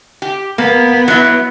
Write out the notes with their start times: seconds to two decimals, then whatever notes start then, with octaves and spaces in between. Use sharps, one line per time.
0.22 G4
0.58 A#3 B3
1.08 F#3 E4